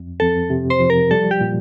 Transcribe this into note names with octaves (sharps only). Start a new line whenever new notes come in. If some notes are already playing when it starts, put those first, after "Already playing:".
Already playing: F2
F2 A4
C3
C5
F3
A#4
G3 A4
G4
A#2